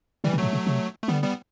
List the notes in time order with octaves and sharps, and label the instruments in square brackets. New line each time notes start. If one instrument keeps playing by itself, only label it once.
[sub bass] C3 [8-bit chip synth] E3 G3
[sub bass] B2
[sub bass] A2 [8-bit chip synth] F#3 A3
[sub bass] B2
C3
[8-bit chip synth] A3
[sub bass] D3 [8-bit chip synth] G3 B3
[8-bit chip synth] G3 B3